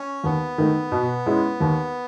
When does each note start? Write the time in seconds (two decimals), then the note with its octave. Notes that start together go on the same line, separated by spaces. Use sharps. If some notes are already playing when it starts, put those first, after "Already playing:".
Already playing: C#4
0.23 D#2 B3
0.58 D#3 A3
0.92 B2
1.26 G#3 C#4 E4
1.60 D#2